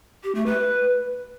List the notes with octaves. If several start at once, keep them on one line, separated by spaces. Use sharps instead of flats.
G4
A3
B4